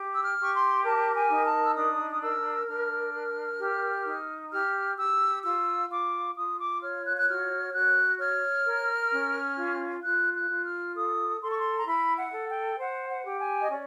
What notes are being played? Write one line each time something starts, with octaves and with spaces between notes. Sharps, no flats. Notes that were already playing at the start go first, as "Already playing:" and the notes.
Already playing: G4
E6
F6
G4 C#6
C6
A#4 A5
G#5
D#4
A5
E6
D4 D#6
D#6
A#4 E6
D4 F6
A#4
G4
D#4
G4 F6
G4 E6
F4 E6
F4 D6
F4 D#6
D6
C#5 F6
F#6
F#6
F#4 F6
F#4 F#6
C#5 F6
A#4
C#4
F4
F4 F#6
F#6
F4
F6
A4 D#6
A4 C6
C#6
C6
A#5
E4 B5
F#5
A4
G5
C5 F#5
F#5
G4
G#5
D#5
C#4 D5